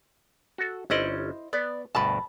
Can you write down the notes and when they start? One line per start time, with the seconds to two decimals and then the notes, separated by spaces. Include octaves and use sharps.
0.58 F#4 A4
0.90 G1 C#4 E4 C5 D5 D#5
1.53 B3 D5
1.95 D2 G2 B2 A5 B5